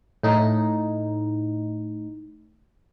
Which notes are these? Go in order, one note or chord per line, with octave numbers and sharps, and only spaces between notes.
A2 D#4